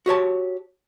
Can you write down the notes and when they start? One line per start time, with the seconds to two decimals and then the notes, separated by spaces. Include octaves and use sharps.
0.06 F#4 G4 C#5 A5